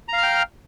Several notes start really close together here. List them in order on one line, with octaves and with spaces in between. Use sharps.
A#5 F5 F6 G5